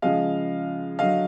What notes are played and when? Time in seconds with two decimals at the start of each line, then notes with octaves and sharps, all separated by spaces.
0.02 C#3 F3 G#3 D#5 F5
0.99 D3 F#3 D#5 F5